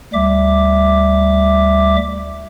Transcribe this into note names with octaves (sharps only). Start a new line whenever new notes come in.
D2 G3 E5 D6